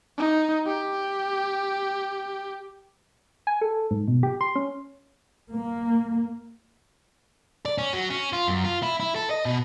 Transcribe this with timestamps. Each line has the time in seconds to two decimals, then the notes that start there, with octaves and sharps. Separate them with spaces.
0.18 D#4
0.67 G4
3.47 G#5
3.62 A4
3.91 G#2
4.08 B2
4.23 G4
4.41 C6
4.56 C#4
5.50 A#3
7.66 D5
7.78 C#4
7.93 F#3
8.10 C#4
8.33 F4
8.48 F#2
8.64 F4
8.83 E4
9.00 E4
9.15 A4
9.30 D#5
9.45 B2